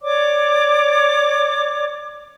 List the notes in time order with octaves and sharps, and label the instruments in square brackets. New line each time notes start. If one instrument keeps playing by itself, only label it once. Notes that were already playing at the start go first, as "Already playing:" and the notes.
[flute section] C#5 D5 D6